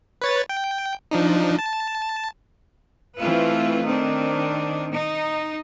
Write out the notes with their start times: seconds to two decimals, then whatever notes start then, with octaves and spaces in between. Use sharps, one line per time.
0.22 B4 C#5 A6
0.49 G5
1.11 F3 D4 D#4
1.59 A5
3.19 E3 A3 C4 F4 B4
3.85 D#3 C4 D4
4.93 D#4